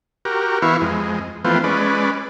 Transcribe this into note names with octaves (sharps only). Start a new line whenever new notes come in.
F#4 G4 A#4
E3 B3 E4 F5 C#6
F2 G#3
E3 F3 A3 B3 C4 F4
G#3 C#4 B4 D5